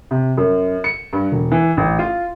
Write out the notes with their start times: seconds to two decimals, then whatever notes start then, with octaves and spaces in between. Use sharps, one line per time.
0.11 C3
0.38 F#2
0.84 C#7
1.13 G2
1.32 E1
1.52 E3
1.77 A1
1.99 F4